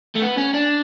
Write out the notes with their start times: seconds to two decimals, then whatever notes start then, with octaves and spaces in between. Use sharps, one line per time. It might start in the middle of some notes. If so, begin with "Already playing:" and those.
0.15 A3
0.22 B3
0.37 C#4
0.53 D4